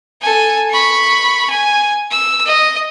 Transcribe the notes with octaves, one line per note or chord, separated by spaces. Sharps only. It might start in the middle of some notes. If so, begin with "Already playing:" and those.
A4 G#5
B5 C#6
G#5
E6
D#5